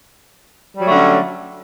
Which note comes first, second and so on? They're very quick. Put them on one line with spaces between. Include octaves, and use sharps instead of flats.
G3 F#3 A3 D3 C#4